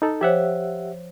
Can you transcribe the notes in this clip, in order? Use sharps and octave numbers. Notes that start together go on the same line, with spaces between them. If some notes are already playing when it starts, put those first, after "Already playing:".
D#4 A4
F3 G4 C5 C#5 E5 F#5